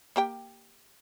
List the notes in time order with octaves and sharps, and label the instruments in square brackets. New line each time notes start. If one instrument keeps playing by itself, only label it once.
[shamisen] A#3 G4 G5